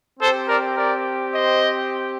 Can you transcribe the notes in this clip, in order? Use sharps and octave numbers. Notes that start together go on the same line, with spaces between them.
C4 G4 A4 C5
A#4 D5
A#4 D5
C5 D#5